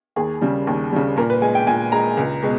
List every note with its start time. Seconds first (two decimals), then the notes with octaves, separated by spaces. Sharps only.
0.16 D#2 G#4
0.41 C#3 G3
0.67 D#2
0.92 C#3 G3
1.17 A#2 A#4
1.30 B4
1.42 G#3 G#5
1.55 G5
1.67 A#2 G#5
1.92 G#3 A#5
2.17 C#2
2.43 B2 G#3